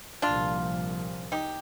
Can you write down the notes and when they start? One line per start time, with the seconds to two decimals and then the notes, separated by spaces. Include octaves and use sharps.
0.22 C2 A#2 F3 D4 F4
1.32 D#4 G4